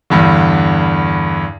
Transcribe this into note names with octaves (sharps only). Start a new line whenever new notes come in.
E2 G2 D3